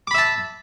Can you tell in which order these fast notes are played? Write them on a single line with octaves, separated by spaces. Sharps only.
D6 B5 E5 A5